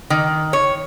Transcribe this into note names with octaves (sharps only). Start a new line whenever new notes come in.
D#3
C#5